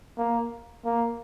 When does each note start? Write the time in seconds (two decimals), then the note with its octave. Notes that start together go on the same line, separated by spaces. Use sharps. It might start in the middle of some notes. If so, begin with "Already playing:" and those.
0.18 A#3
0.85 A#3